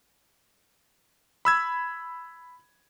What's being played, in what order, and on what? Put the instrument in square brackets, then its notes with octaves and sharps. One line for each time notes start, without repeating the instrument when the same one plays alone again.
[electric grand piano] B5 E6 G#6